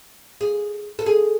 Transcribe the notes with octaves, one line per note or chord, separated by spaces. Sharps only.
G#4
A4
G#4